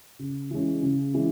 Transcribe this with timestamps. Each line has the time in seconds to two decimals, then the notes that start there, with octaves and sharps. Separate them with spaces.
0.19 C#3
0.51 E3 G#3 C#4
0.83 C#3
1.14 E3 G#3 C#4